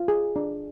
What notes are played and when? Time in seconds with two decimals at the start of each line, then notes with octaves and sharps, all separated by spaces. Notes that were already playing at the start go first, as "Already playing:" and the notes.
Already playing: F4
0.08 G#4
0.36 D4